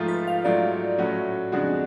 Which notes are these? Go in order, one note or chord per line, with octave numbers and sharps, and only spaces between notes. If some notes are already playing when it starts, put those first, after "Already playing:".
Already playing: G#2 F3 A3 F4
B4
F5
G#2 F#3 A3 F4 D5
A2 F#3 A3 C#4 F#4
F2 C#3 G#3 D4 F#4